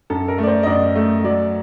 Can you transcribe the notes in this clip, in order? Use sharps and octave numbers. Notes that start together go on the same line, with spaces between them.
F#2 A4
A#4
A3
D5
C5
D#5
F#2 D5
A3
F#3 D5